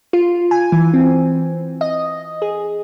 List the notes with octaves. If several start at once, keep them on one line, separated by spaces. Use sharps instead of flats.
F4
G#5
E3
C4
D#5
G#4